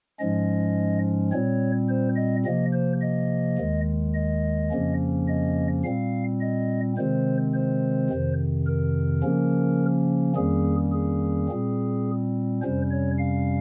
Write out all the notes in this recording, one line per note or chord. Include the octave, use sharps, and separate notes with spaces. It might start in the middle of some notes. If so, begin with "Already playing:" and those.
G#2 F3 G#3 C#4 D#5
A#2 G3 C4 C#5
C5
D#5
C3 F3 A#3 D#5
C5
D#5
D#2 D#3 G#3
D#5
F2 C#3 F3 A#3 C#4
D#5
A#2 G3 C4 F5
D#5
C3 D#3 G#3 C4 C5
C5
F2 C3 D#3
A#4
C#3 F3 A#3 C#4
F2 D#3 G3 A#3 C#4 G#4
G#4
A#2 G3 C4
F2 C3 G3 C#4 C5
C#5
F5